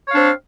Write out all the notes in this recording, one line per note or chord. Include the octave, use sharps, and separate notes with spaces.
C4 D4 C#5 F5